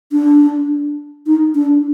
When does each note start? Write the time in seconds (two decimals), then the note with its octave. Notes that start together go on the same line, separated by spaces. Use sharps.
0.12 D4
1.27 D#4
1.55 D4